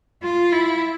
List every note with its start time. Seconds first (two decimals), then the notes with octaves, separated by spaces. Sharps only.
0.23 F4
0.52 E4